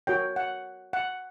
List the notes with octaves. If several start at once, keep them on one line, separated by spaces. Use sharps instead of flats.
F#4 A#4 C#5 G5
F#5
F#5